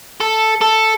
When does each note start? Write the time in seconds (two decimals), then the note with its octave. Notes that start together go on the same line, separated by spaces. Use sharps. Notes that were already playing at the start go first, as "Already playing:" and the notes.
0.20 A4
0.61 A4